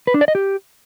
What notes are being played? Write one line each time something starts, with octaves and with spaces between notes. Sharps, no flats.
B4
D4
D5
D#5
G4